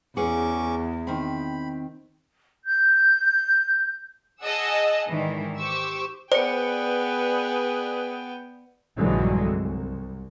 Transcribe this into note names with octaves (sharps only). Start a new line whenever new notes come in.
E2 C#4 G#4 B4 F#5 C#6 D6
D#3 C4 B5
G6
G#4 D#5 F#5 A5 E6
G#2 D#3 E3 D4
G4 C5 C#6 D6 E6
B3 G#4 B4 C5 D5 G5 C#7
A#1 G2 D3 E3 F#3 G#3
C2